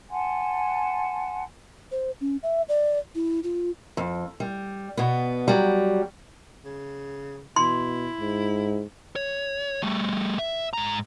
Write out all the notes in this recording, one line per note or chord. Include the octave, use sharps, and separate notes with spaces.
F#5 G#5 A5 C6
C5
C#4
E5
D5
E4
F4
F2
G3
B2 B3
F#3 G3
C#3
B2 E4 C6
G#2
C#5
G3 A3
E5
G#2 A#5